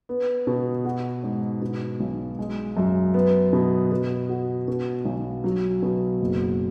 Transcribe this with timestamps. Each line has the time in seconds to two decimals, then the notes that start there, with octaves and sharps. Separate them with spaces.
0.09 B3
0.47 B2
0.85 F#4
1.23 G#2
1.62 B2
2.00 B1
2.39 G#3
2.77 F#2
3.14 B3
3.53 B2
3.92 B2
4.29 F#4
4.68 B2
5.05 B1
5.44 F#3
5.82 B2
6.21 F#1